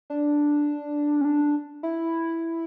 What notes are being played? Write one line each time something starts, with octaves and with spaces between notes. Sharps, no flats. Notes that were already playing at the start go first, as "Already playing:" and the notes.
D4
C#4
D4
E4